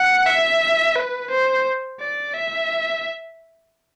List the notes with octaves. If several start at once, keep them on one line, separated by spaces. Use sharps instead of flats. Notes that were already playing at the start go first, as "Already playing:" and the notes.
Already playing: F#5
E5
B4
C5
D5
E5